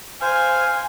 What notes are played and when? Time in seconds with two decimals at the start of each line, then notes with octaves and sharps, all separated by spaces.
0.22 C5 F5 G#5